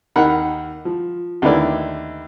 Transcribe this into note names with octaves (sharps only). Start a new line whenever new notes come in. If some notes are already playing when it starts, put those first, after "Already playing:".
D#2 D#3 D#4 A#4 F#5 B5
F3
D#2 D3 A3 E4 B4 D5